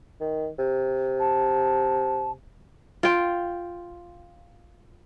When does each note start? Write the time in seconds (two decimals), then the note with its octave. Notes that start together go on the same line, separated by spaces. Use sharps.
0.20 D#3
0.59 C3
1.19 A5
3.03 F4 G5